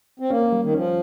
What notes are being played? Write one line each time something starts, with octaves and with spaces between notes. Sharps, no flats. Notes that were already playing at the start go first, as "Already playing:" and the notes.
C4
A#3 C#4
G3
D#3
F3 C#4